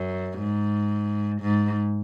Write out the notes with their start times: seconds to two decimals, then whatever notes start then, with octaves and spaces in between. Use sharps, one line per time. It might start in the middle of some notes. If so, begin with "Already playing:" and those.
Already playing: F#2
0.39 G#2
1.42 G#2